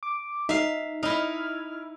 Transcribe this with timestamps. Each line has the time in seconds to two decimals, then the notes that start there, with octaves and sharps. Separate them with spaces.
0.03 D6
0.49 D#4 E5 F5
1.03 D#4 E4 F6